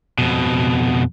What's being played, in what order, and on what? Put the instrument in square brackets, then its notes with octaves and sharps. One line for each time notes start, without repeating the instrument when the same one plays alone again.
[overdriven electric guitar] F2 B2